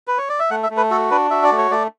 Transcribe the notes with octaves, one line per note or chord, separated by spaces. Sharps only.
B4
C#5
D5
E5
A3 F#5
E5
A3
B4
F#4 A4
D4 B4
F#4 E5
D5
A3
C#5
A3 D5